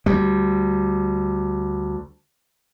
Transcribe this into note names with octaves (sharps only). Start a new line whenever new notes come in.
D2 G3